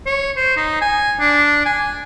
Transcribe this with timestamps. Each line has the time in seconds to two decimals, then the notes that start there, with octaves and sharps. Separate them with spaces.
0.06 C#5
0.37 C5
0.57 D#4
0.81 G#5
1.20 D4
1.65 G#5